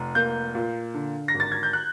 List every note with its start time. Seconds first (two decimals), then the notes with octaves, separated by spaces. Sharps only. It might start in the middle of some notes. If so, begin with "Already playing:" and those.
Already playing: F1
0.15 A#3 G6
0.55 A#2
0.94 D3
1.28 A#6
1.34 G#1
1.40 A6
1.52 G#6
1.63 G6
1.73 F#6